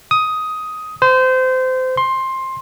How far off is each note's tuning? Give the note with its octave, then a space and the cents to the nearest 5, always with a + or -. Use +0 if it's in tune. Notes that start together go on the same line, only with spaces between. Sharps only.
D#6 +10
C5 -25
C6 +15